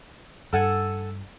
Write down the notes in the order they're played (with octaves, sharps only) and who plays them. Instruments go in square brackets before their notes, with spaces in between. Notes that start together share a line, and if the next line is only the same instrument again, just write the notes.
[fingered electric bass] G2 [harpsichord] A4 F#5 G#5